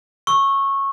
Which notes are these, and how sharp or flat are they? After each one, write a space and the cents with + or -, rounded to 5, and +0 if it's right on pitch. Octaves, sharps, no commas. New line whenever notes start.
C#6 -15 E6 +0